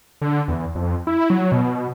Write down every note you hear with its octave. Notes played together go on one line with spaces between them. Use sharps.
D3
E2
F2
E4
F#3
B2